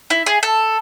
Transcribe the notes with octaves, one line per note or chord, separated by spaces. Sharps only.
E4
G#4
A4